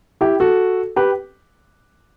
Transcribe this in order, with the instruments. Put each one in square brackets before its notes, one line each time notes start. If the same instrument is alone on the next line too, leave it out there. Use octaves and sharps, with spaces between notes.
[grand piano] E4 G4
F#4 A4
G4 B4